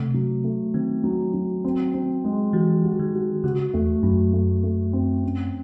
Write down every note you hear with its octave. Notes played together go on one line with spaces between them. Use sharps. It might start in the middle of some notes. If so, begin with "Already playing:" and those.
Already playing: C3 A3
F#3
A3
D#3 C4
F#3
F#3
C4
C4
G#3
E3 F#4
F#4
D#3
F#4
C#3 F#4
E2 A3
F#2 F#3
A3
A3
C4
C#4